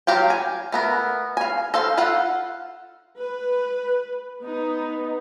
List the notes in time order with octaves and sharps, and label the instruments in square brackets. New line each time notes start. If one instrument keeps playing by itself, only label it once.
[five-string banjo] F#3 G4 F5 G5
G#5
A3 B3 A#4
F5 G#5
A4 C5 F5
F4 A4 F5 F#5
[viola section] B4
B3 D#4